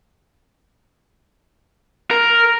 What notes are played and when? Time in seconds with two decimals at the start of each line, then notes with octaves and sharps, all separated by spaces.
2.11 A#4